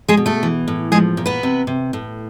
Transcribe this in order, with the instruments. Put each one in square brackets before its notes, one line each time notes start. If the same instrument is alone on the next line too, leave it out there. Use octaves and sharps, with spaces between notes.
[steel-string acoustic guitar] G#3 G#4
B2
A3 A4
E3
A2
F3 G#3 G#4
A#2
B3 B4
C3
C3
A2